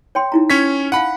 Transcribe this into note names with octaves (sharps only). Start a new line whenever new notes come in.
C#5 G5 C6
D#4 E4 A#5
C#4 C#5 B6
F5 F#5 A5 B5